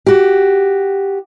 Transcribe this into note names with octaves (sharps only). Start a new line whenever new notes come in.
F#4 G4